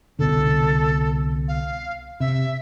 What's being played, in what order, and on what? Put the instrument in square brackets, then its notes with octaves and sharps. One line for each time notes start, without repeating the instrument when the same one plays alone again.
[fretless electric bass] C2 B2 D3 [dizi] A4
[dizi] F5
[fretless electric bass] C3 [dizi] E5